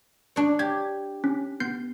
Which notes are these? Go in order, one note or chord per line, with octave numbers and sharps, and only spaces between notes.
D4 C#5
G4 G#6
C#4
B3 G6 C7